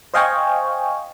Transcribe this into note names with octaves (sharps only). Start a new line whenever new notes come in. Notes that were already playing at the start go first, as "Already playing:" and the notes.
C5 D#5 F5 G5 G#5 C#6